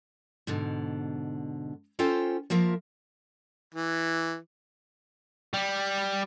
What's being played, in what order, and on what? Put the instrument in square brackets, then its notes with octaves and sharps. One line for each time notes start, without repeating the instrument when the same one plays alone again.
[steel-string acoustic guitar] G#2 B2 D3
C#4 F4 A4 C5 G5
F3 A#3 F4 A#4 E5
[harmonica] E3
[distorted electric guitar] G3